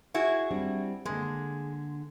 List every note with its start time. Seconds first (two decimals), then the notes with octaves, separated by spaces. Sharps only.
0.14 E4 F#4 G#4
0.51 G3 C4 D4
1.06 D3 G#3 A#3